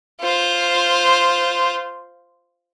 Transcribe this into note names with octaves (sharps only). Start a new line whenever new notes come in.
F4 C5